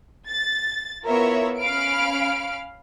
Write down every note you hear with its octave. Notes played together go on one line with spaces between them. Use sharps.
A6
B3 E4 F4 A#4 C#5 E5
C#4 F5 B5 F6 D7